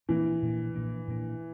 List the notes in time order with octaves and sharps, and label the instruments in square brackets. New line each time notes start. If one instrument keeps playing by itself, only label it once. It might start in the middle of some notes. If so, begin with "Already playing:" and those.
[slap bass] A#2 F3 A#3 D4 [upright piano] E3
[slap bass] A#2 F3 A#3 D4
A#2 F3 A#3 D4
A#2 F3 A#3 D4